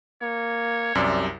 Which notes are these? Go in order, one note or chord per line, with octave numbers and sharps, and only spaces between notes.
A#3 C#5
C2 F#2 C3 D5